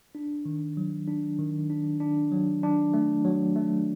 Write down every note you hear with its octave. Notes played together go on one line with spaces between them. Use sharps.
D4
D#3
F#3
D4
D#3
D4
D4
F#3
D4
A3
F#3
A3